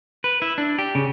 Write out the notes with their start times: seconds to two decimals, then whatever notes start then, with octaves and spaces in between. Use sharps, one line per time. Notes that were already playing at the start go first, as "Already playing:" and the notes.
0.24 B4
0.42 E4
0.58 D4
0.79 G4
0.95 C#3